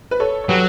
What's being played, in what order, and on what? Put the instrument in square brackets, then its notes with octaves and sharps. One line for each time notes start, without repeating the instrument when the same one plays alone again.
[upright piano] B4
A4 C#5
C#5
[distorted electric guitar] F#3 [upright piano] G4 B4